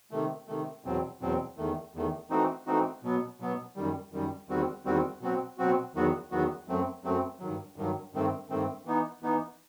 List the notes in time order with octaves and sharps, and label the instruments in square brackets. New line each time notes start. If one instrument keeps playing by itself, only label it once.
[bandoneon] C3 D#3 A3
C3 D#3 A3
E2 B2 F#3 C4
E2 B2 F#3 C4
E2 D#3 A3
E2 D#3 A3
E3 A3 C4 D#4 F#4
E3 A3 C4 D#4 F#4
B2 F#3 B3
B2 F#3 B3
F#2 D#3 G3
F#2 D#3 G3
E2 D#3 G3 C4 F#4
E2 D#3 G3 C4 F#4
B2 F#3 C4 F#4
B2 F#3 C4 F#4
E2 D#3 F#3 B3 F#4
E2 D#3 F#3 B3 F#4
F#2 F#3 A3 C4
F#2 F#3 A3 C4
G2 D#3 F#3
G2 D#3 F#3
G2 D#3 A3 C4
G2 D#3 A3 C4
E3 B3 D#4
E3 B3 D#4